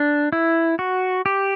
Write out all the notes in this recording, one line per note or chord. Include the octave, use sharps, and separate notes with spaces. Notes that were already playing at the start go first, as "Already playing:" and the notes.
Already playing: D4
E4
F#4
G4